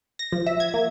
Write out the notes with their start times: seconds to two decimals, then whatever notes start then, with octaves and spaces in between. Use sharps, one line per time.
0.19 A#6
0.32 F3
0.46 E5
0.60 G#6
0.74 A#3